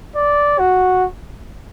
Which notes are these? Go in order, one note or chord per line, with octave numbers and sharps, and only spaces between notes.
D5
F#4